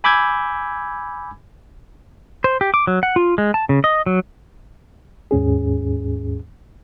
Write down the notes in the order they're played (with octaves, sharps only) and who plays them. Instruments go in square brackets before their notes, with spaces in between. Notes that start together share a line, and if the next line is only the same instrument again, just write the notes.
[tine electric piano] G#5 B5 D6 E6 G6 G#6
[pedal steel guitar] C5
G4
D6
F#3
F#5
F4
G#3
A5
C#3
D#5
F#3
[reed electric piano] D#2 G#2 C#4 G#4